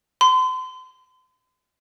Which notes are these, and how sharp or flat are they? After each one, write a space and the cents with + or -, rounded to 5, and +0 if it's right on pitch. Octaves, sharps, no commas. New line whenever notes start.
C6 -40